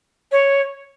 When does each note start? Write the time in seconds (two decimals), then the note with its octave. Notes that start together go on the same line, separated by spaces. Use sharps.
0.31 C#5